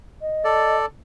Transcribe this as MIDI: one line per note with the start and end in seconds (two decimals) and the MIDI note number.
0.21 0.76 75
0.44 0.86 69
0.44 0.86 74